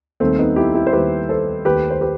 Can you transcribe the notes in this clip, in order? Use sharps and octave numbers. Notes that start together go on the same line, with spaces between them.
D#2 D#3 G3 A3 C4
B3 D#4
E4 G4
E4 G4
C5
D#2 D#3 G3 G4 B4
A4 C5
D#2 D#3 A3 G4 B4
C5
G4 B4